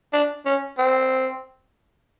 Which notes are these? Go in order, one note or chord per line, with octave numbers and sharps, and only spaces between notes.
D4
C#4
C4